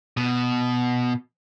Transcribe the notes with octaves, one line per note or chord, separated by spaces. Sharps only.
B2